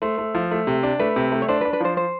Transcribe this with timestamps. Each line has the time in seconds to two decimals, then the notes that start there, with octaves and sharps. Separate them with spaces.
0.02 A3 C5
0.18 A3
0.35 F3
0.51 A3
0.67 C3
0.83 D4
0.99 A3 B4
1.16 C3
1.32 A3
1.42 C#5
1.48 D4 C5
1.61 B4
1.65 D4
1.73 B4
1.80 F3 C5
1.97 C5